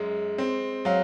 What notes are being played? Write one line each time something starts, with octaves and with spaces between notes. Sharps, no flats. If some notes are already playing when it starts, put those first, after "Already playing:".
Already playing: F#2 G#3
C4
F#3 F5